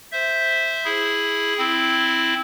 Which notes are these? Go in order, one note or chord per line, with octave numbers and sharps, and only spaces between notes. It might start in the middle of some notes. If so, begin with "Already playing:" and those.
C5 E5
E4 G#4
C4 E4